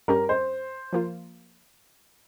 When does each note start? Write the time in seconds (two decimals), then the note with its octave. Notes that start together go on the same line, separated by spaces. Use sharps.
0.08 G2 G3 C#4 G4 A#4
0.29 C5
0.93 F3 A#3 F4